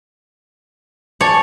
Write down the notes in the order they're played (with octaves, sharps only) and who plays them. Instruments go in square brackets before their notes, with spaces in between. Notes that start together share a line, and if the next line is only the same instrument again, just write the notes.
[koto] C#5 [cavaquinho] D5 G#5 A5